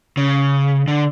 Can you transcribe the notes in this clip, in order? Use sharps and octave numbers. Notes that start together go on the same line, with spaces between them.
C#3
D3